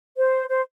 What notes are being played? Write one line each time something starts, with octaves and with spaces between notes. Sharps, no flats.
C5
C5